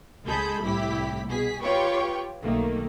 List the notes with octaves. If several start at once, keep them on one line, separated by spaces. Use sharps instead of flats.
C#2 G#3 G#4 A4 B5 G6
C2 A2 E4 G4 B6
B2 G#4 B6
F4 G4 B4 C#5 G5 C#6
B1 D#3 A3 A#3